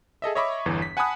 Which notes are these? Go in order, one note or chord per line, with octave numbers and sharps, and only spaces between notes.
G#4 A4 D#5 E5
C#5 D#5 E5 B5 C#6 D6
G1 E2 E3
B6
F#5 G#5 A5 B5 D#6 F#6